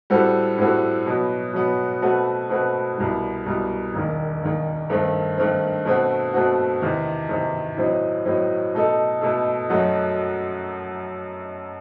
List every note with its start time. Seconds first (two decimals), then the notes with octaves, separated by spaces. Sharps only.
0.10 A2 G3 C4 F#4 A4
0.58 A2 G3 C4 F#4 A4
1.06 B2 F#3 B3
1.53 B2 F#3 B3
2.02 B2 A3 C4 F#4 B4
2.49 B2 A3 C4 F#4 B4
2.97 C2 B2 G3
3.46 C2 B2 G3
3.94 E1 D#2 D#3
4.42 E1 D#2 D#3
4.90 G2 D#3 A3 C4
5.38 G2 D#3 A3 C4
5.85 B2 A3 C4 F#4
6.33 B2 A3 C4 F#4
6.82 E2 C3 D#3
7.29 E2 C3 D#3
7.77 A2 F#3 C4 D#4
8.25 A2 F#3 C4 D#4
8.74 B2 A3 D#4 A4
9.21 B2 A3 D#4 A4
9.70 F#2 F#3 A3 D#4 F#4